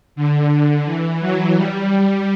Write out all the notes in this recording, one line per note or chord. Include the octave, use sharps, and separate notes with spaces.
D3
E3
F#3
G3
G3